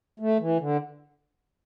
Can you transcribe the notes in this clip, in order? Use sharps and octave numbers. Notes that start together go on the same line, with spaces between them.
A3
E3
D3